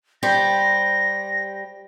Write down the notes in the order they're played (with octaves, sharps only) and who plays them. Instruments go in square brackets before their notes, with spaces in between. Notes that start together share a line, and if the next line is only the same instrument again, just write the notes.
[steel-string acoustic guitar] G3 G4 C5 [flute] A#6